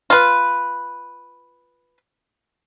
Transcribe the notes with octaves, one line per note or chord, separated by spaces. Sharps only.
F4 B4